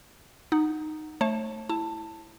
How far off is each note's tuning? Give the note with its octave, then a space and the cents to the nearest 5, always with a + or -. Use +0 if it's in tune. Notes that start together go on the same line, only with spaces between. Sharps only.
D#4 -10 F#5 +0
A3 +0 C#5 -40 A5 +0
E4 +0 A5 +15